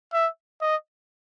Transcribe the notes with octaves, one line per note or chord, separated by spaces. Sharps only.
E5
D#5